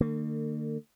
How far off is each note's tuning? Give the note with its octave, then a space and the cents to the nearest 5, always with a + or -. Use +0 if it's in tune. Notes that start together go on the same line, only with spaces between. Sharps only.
D3 +40 A#3 -45